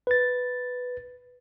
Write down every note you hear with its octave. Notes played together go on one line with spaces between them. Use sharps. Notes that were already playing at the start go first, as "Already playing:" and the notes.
B4 A6